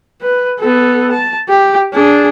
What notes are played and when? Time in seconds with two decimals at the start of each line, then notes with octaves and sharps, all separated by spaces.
0.22 B4
0.59 B3 A4
1.11 A5
1.49 G4
1.93 D4 G#4